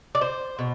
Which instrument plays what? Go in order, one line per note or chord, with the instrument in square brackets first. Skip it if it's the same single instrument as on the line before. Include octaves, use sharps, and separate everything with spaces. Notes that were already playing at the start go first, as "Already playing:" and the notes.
[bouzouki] D5
C5
B2